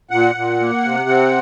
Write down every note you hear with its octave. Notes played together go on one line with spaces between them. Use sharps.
A#2 F#5
A#2
A#3
C3
C4